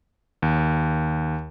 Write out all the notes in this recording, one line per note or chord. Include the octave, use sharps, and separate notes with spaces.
D#2